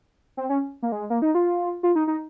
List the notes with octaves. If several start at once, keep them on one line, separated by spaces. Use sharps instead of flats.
C4
C#4
A#3
G#3
A#3
D#4
F4
F4
D#4
D#4